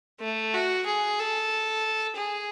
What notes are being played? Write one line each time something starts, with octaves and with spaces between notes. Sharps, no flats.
A3
F#4
G#4
A4
G#4